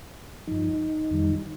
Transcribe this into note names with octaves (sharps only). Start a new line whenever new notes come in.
G2 F3 D#4
F2 D#3 G3